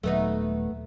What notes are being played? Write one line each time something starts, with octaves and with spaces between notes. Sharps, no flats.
D#1 F#3 A3 B3 D#4